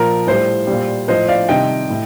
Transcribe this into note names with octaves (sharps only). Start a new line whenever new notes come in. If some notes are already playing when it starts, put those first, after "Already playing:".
Already playing: A#2 F3 A#4
A2 G3 C5
A#2 G3
A2 F3 C5 D#5
D5 F5
C3 D#3 G3 D#5 G5
A2